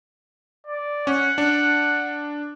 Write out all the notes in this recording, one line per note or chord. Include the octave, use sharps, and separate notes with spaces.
D5
C#4 F#5
D4